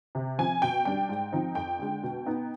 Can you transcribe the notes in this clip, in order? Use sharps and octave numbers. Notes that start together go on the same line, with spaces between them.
C3
F3 C4 G#5
B2 G5
G3 D4 G5
G#2
F3 C4 D#4
F2 G5
D3 G#3
B2
B3 D#4